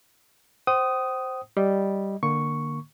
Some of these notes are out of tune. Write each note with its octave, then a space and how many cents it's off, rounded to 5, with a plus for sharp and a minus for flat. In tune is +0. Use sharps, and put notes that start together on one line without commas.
C5 +0 G5 -45 D#6 +0
G3 -5 D#5 +0
D3 +25 A#3 +0 C#6 +0